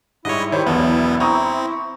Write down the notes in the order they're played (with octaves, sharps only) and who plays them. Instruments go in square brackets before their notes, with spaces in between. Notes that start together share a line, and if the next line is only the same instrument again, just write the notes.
[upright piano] G#2 G3 [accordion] E4 [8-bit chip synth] C#5 D#5
[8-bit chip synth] D#3 [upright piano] G4 C5 C#5
[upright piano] E1 B1 [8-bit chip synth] B3
[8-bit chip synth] C4 [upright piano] A#5 C#6 D#6